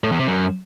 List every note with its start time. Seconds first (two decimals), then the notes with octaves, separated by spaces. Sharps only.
0.04 A2
0.11 E2
0.19 C3
0.27 F#2